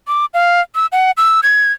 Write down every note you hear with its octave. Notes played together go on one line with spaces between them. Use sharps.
D6
F5
E6
F#5
E6
G#6